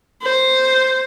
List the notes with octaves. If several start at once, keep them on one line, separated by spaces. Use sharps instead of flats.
C5